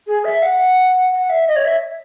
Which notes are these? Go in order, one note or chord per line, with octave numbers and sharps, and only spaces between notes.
G#4
E5
F#5
F#5
E5
D#5
C#5
E5